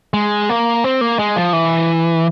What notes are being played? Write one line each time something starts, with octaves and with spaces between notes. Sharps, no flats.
G#3
A#3
C4
A#3
G#3
F3
E3